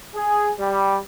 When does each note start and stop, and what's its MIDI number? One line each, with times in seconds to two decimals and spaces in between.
0.14 0.50 68
0.59 0.97 55